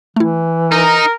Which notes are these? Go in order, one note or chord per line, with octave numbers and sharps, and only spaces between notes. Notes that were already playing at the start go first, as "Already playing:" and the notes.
E3 A3 E4
D#4 A#4